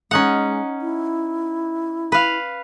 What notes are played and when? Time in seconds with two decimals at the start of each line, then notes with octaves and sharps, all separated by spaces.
0.11 G#3 C#4 D#4 F#5
0.82 E4
2.12 B4 F5